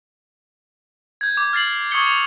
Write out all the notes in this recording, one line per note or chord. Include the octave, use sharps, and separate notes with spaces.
G6 G#6
D6
F6 A6 C7 F#7
C#6 D#6 G#6 C#7 G7
F7